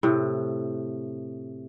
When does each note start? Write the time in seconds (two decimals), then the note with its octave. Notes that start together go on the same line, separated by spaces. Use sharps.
0.03 A2 C3